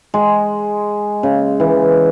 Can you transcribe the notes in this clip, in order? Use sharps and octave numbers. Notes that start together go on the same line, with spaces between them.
G#3
C#3
E3